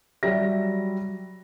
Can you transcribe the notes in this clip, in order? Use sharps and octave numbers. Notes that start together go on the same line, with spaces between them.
F#3 G3 E5 A#6